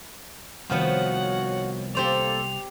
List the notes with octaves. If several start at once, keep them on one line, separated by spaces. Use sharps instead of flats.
C2 D#3 F3 B3 F#4 C#5 F#5
A#3 G4 A4 C5 D5 F7